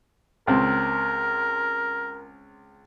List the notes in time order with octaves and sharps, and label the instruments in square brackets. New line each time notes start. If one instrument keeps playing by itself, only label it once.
[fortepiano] C#2 C4 [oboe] A#4